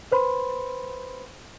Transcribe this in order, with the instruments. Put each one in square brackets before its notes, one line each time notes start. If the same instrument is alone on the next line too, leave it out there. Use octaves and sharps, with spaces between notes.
[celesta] B4 C5 B5 C6